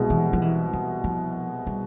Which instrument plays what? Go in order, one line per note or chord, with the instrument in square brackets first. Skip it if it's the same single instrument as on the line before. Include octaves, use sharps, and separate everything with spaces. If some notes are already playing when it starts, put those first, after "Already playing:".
Already playing: [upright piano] C2 B2 G#3
[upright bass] E3
F3
E3
E3
F3
G3